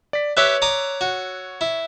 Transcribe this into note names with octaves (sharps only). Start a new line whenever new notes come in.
D5 B6
G4 B4 C#5 E5 E6 F#6
D5 A#5 D#6
F#4
E4